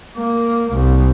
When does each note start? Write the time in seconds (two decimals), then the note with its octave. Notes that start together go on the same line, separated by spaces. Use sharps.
0.17 A#3
0.73 C2